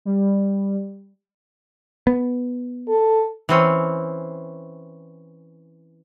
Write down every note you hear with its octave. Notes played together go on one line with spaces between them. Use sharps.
G3
B3
A4
E3 C4 C#4